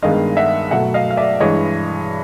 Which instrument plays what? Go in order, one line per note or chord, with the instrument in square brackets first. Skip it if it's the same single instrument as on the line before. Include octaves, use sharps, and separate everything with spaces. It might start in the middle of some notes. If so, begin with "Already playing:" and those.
[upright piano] G2 D#3 G#3 B3 D#5 F5
E5 F#5
B2 F#3 A3 E5 F#5
D#5 F5
F5
D5 E5
G2 E3 G#3 C#5 D#5